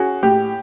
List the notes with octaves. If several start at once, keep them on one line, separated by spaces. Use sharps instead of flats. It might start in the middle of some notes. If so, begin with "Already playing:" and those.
Already playing: C#4 F#4 G#4
A2 G4